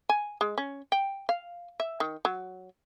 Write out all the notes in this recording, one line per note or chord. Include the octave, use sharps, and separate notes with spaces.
G#5
G#3
C#4
G5
F5
E5
D#3
F#3